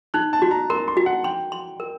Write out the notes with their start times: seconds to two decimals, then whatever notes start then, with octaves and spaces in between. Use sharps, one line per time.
0.14 D#4 F#6
0.33 A5
0.42 F#4
0.51 A#5
0.70 A#4 C6
0.88 C6
0.97 F#4
1.06 F#5
1.24 G5 C6
1.52 C6
1.80 A#4